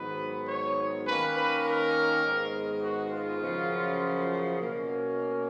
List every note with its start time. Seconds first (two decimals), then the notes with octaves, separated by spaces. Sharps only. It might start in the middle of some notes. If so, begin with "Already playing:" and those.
Already playing: G#2 D#3 F#3 B3 B4
0.47 C#5
1.06 D#3 A#3 C#4 B4
1.36 B4
1.65 A#4
2.23 G#2 D#3 G#3 B3
2.83 F#4
3.12 F4
3.42 F#2 C#3 F3
4.60 B2 A#3 C#4